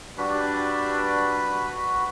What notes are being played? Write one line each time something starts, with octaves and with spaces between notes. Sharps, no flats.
G3 D4 F#4 B4 B5